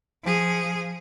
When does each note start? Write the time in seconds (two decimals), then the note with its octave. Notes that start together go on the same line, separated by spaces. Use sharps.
0.24 F3 G#4